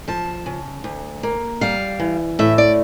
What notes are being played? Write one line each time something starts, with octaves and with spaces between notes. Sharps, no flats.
F3 A5
C#3
D2
A#3
G3 F5
E3
A2 E5
D5